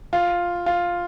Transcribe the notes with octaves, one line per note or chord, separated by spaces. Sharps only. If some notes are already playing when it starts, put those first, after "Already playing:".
F4
F4